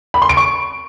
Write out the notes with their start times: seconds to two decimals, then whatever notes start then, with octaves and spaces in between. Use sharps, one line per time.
0.14 B5
0.22 C6
0.29 D7
0.37 C#6